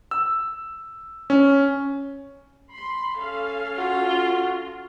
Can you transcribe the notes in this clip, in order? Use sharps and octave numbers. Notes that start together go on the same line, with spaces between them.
E6
C#4
B5 C6
C#4 A4 F5
F4 F#4